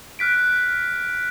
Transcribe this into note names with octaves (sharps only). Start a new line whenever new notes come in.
F6 F#6 B6 D7